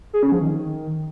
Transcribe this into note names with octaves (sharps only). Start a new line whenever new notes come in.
G#4
C#4
F3
D#3